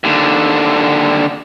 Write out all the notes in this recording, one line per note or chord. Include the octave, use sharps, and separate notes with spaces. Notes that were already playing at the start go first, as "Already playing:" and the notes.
D#2 D3